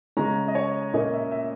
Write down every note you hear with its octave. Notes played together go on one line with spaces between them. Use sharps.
C#3 G#3 C#4 A#5
D#5
C#5
A#2 A#3 C#4 D#5
E5
E5